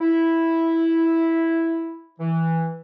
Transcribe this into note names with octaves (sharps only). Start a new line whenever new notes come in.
E4
E3